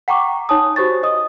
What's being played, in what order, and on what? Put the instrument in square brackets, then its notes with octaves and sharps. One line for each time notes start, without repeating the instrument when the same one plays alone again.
[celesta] F#5 G5 A#5 C#6 D6
D#4 C#5 G#5 A5 D#6
F#4 G4 C5 C#5 C#6 A6
G4 D#5 D#6